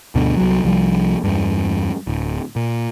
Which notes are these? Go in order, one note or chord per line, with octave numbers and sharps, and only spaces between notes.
D2 G2 B2 D3
C2 F#3
C2 F3 G3
E2 G2
D1
A#2